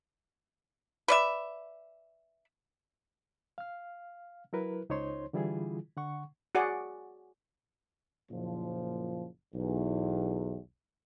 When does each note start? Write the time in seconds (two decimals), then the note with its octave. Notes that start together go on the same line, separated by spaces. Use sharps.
1.08 B4 D5 E5
3.58 F5 F6
4.53 F#3 E4 A#4 B4
4.90 C#2 D#4 C5 C#5 C6
5.33 D3 E3 G3 E4 F4 G#4
5.97 D3 F#5 C#6
6.55 F#4 G#4 D5 F#5
8.31 F#1 A#2 F3
9.54 B1 E2